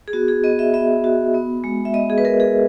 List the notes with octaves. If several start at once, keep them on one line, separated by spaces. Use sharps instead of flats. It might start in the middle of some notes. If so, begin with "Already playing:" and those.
G#4
B3 F#4
G#4
B3 D#5
E5
B3 E5
F#4
B3
G#3
E5
B3 D#5
G#4
B4
B3 A#4
G#4